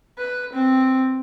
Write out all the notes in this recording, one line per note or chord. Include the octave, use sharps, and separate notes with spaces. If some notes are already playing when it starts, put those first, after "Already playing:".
B4
C4